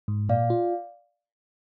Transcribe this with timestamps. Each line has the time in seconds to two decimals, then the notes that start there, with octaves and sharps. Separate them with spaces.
0.08 G#2
0.29 A#2 D5 F5
0.50 F4